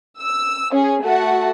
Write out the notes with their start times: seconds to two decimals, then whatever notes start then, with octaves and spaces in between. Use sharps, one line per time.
0.18 E6
0.72 C#4 G#4
1.03 A3 F#4 F#5 A5